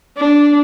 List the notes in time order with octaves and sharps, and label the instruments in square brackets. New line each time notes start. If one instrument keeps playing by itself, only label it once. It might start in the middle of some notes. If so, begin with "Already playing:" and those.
[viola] D4